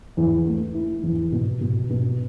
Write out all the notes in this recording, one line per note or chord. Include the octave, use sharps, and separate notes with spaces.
E2
A3
E4
E2
B2
B2
B2